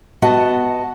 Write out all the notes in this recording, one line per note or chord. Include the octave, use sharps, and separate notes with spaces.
B3 F#4 D#5 F#5 A5